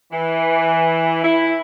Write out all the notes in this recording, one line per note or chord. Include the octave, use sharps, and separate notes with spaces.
E3
E4